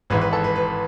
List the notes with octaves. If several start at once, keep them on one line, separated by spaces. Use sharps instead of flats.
G#1 G#2 E3 B4
B4
A4
B4
B4